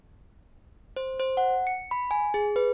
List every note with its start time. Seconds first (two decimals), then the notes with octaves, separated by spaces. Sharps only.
0.96 C5
1.19 C5
1.37 F#5
1.67 C#7
1.91 B5
2.11 G#5
2.34 G#4
2.56 B4